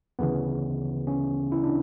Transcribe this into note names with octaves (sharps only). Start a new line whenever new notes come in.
D2 C#3 E3 B3
C#4
E4
D4